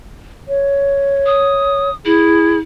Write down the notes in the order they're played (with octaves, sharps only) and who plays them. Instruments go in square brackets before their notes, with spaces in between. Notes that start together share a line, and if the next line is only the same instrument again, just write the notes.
[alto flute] C#5
[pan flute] D#6
[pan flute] E4 [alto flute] G#4